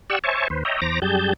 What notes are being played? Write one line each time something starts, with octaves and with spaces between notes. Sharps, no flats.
G4 D5 F#5 C#6 E6
C5 C#5 E5 G#5 A5 C#6
D#2 B4 C5
C#5 D#5 E5 G5 A#5
E2 C5 A#5 D6 A#6
F#2 G3 G4 G#4 A5 G6